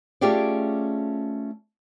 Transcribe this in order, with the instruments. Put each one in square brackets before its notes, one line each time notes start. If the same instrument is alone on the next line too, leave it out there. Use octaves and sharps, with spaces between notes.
[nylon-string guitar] A3 C#4 F4 G4 G#4 D5